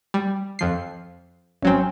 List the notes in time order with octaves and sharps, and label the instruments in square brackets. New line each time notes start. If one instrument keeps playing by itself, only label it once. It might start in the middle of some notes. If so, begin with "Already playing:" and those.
[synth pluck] G3
F2 F3 C7
[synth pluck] G#1 F#3 C4 [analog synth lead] C#4